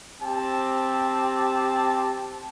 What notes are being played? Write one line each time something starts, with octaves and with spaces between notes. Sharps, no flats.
C4 G4 A5